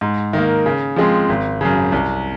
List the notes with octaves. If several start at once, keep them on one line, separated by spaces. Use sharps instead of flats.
G#2
D#3 A#3
C#3
F3 G#3 C4
G#1
F#2 C#3
C2